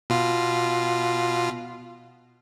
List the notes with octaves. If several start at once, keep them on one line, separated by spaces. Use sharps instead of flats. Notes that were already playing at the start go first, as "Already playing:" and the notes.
B2 F4